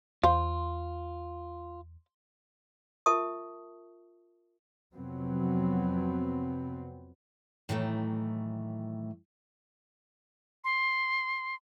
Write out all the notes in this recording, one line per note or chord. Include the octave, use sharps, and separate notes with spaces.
E2 F4 C5 F5 C6
F4 A#4 E5 A5 C#6 D#6
F2 C3 F#3 B3 C4
A2 D#3 E3 F#3 G3 A3
C6